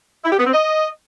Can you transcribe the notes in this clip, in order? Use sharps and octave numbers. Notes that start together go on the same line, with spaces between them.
E4
G4
B3
C4
D#5